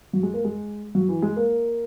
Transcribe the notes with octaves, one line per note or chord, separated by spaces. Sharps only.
F#3
G#3
A#3
G#3
F#3
E3
G#3
A#3